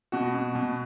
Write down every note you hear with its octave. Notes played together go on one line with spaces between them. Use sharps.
B2 F#4
B2
B2